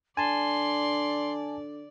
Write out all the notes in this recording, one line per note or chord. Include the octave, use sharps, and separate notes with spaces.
D3 D5 G#5 A5 C6